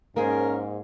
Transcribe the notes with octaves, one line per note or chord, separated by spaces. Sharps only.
G#2 A#3 C#4 G#4 A#4 C5